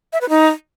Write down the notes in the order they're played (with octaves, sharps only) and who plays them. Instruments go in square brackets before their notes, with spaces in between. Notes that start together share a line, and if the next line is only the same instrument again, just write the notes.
[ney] E5
B4
D#4